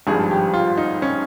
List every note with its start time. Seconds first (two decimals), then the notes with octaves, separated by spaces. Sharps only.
0.07 G#1 G2 F3 G#3 G#4
0.31 G4
0.54 F4
0.77 D#4
1.02 C#4